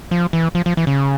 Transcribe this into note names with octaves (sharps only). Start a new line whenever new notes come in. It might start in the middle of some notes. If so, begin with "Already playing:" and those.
F3
E3
F3
F3
E3
C#3